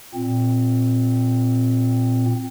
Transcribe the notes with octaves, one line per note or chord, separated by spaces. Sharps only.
A#2 C4